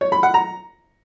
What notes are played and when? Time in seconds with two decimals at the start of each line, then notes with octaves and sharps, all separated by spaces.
0.01 C#5
0.12 B5
0.23 F#5
0.34 A#5